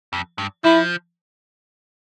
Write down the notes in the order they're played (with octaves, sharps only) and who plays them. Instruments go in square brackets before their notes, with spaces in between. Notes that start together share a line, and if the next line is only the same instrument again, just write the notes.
[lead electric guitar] F2
G2
[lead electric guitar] F3 [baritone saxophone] E4